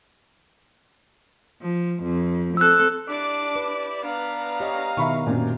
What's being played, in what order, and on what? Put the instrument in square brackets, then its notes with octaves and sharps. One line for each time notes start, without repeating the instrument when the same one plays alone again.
[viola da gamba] F3
F2
[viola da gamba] C4 A4 [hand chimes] E6 F#6
[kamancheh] D4 D6 [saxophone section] E4 G4 D5
[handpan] B4
[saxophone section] B3 D4 [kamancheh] F5 A#5
[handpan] G4 C#5 D#5
[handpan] B2 D#3 E4 [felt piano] E5 B5 C#6
[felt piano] F#2 A#2 [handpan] C4